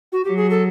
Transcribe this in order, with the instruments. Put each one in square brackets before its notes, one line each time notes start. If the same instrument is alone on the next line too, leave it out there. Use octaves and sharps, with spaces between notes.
[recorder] F#4
[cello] F#3 [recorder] G4
[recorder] G#4
A4